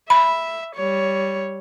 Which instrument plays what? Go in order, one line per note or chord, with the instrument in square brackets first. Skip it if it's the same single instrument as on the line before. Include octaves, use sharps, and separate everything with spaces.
[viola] E5 [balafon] B5
[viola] G3 C#5